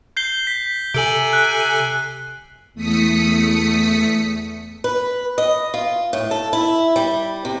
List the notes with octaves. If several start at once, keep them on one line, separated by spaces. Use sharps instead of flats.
G6 C7 G7
B6
C3 A4 G#5 D7 F#7
F#6
E2 A3 D#6 B6 C#7
B4
D#5
F4
A2
A4
E4
G3
C3